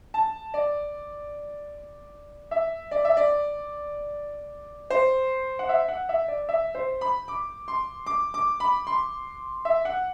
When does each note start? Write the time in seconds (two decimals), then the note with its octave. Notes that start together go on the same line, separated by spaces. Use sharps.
0.14 A5
0.54 D5
2.51 E5
2.91 D5
3.05 E5
3.17 D5
4.90 C5
5.59 F#5
5.69 E5
5.88 F#5
6.09 E5
6.28 D5
6.49 E5
6.75 C5
7.01 B5
7.28 D6
7.68 C6
8.06 D6
8.34 D6
8.60 B5
8.87 C6
9.65 E5
9.85 F#5